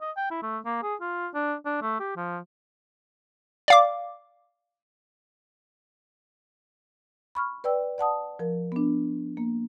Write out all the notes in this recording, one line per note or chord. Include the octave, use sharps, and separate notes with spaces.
D#5
G5
E4
A3
A#3
G#4
F4
D4
D4
A3
G4
F3
D5 F5 D6
B5 C#6 F6
B4 D5 G5 E6
D5 F#5 A5 D#6
F3 A#4
B3 D4
A#3